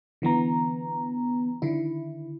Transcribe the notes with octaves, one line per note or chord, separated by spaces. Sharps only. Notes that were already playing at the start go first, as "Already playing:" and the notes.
D3 E3 B3 A#5
D3 D#3 E4